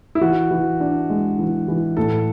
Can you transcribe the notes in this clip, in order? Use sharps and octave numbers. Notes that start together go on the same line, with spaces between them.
E4
E3 F#4
E3
D4
G#3
E3
E3
A2 A4